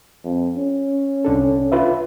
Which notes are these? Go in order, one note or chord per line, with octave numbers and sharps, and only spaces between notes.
F2
C#4
C2 D4 A4
F4 B4 E5